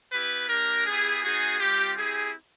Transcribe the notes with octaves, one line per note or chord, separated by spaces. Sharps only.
B3 E4 G4 B4
A#3 D4 G4 A#4
B3 E4 G4 G#4
B3 D#4 F#4 G#4
G3 C4 F4 G4
C4 E4 G4 G#4